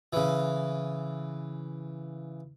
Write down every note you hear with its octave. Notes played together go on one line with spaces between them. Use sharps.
C#3 E3